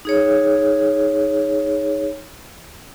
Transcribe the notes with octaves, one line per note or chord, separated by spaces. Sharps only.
D#4 G#4 C#5